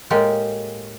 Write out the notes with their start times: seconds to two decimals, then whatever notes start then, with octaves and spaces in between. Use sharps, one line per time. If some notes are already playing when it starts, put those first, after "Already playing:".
0.10 A2 G#3 A#3 G4 A4 G5